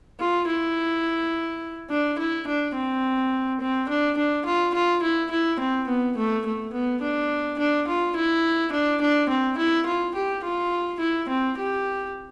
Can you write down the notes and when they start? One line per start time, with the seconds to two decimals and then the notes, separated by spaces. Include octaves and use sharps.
0.20 F4
0.48 E4
1.90 D4
2.19 E4
2.47 D4
2.75 C4
3.60 C4
3.89 D4
4.17 D4
4.45 F4
4.74 F4
5.02 E4
5.31 E4
5.60 C4
5.88 B3
6.17 A3
6.46 A3
6.73 B3
7.01 D4
7.59 D4
7.88 F4
8.16 E4
8.72 D4
9.01 D4
9.29 C4
9.58 E4
9.86 F4
10.15 G4
10.43 F4
11.00 E4
11.28 C4
11.57 G4